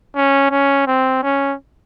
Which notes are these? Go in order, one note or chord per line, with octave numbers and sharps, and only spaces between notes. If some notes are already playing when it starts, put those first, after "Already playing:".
C#4
C#4
C4
C#4